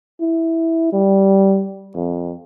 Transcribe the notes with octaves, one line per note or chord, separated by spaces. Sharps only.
E4
G3
F2